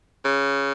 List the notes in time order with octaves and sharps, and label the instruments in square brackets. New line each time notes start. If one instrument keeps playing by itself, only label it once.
[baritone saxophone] C#3